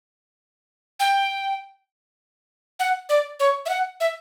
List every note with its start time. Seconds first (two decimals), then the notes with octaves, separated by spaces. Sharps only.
1.00 G5
2.80 F#5
3.09 D5
3.40 C#5
3.66 E5
3.69 F#5
4.00 E5